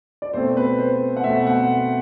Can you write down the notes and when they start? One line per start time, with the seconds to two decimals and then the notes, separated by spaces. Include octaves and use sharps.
0.22 D5
0.33 B2 A3 C4 C5
0.57 B4
0.78 C5
1.17 F#5
1.24 B2 A3 C4 E5
1.46 F#5